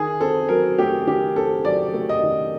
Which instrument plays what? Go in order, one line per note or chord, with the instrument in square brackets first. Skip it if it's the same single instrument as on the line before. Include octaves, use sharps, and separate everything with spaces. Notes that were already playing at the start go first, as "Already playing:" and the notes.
Already playing: [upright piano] D#3 G#4
C4 A4
F#3 A#4
A3 G4
D#3 G4
C4 A4
F#3 D5
A3
D#5
D#3